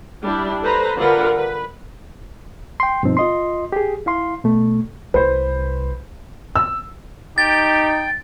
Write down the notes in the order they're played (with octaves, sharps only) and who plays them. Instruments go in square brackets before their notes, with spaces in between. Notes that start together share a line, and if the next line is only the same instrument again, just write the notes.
[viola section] G3 D4 E4
A4 B4 C5 A#5
D3 G3 F4 A#4 B4 F#5
B4
[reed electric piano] G5 C6
G2 B2 F3 C4 D#4
F4 D#5 C6
G4 G#4
E4 F5 C6
B2 A3
[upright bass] C2 [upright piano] B4 C5
[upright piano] E6
[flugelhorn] D#4 [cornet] G4 [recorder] G5 [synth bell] A6